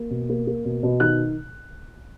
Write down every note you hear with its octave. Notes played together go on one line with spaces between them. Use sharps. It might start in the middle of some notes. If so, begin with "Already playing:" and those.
Already playing: A#3
B2
A#3
A#3
B2
B2
D#3 F#6